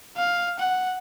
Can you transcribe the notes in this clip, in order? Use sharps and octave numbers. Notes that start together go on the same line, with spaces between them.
F5
F#5